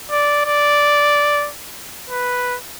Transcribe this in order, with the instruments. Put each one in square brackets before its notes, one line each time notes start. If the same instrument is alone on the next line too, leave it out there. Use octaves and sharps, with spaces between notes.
[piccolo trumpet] D5
D5
B4